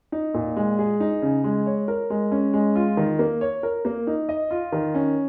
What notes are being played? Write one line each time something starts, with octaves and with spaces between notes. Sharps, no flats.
D#4
A#2
G#3
G#4
D#4
C#3
G#3
C#5
A#4
G#3
C#4
G#3
F4
D#3
A#3
C#5
A#4
A#3
D#4
D#5
F4
D#3
C#4